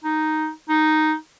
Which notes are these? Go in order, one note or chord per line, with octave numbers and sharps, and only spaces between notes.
D#4
D#4